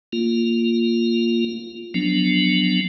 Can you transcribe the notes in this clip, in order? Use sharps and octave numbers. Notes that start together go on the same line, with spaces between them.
A#3 F4
F3 F#3 B3 D4